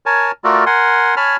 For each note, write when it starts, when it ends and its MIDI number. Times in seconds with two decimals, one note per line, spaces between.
0.06 0.32 70
0.06 0.32 73
0.06 0.32 80
0.06 0.32 81
0.44 0.64 57
0.44 0.64 65
0.44 0.64 66
0.44 0.64 69
0.44 0.64 70
0.44 0.64 74
0.66 1.15 70
0.66 1.15 78
0.66 1.15 80
0.66 1.15 84
1.17 1.37 73
1.17 1.37 80
1.17 1.37 81
1.17 1.37 83
1.17 1.37 89